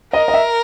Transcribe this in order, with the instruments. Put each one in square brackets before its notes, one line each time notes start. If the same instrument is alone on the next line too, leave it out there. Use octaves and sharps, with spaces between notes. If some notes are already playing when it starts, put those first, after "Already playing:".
[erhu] A#4 [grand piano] D#5
[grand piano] D#5
E5